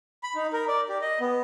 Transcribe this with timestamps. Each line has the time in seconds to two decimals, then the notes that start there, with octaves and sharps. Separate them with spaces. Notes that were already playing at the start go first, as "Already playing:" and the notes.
0.23 B5
0.35 D#4
0.53 A#4
0.68 D5
0.89 G4
1.01 D#5
1.20 B3